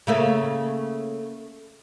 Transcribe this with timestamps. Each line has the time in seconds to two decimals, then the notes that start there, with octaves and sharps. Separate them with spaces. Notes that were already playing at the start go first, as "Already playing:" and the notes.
0.07 C#3 A3 A#3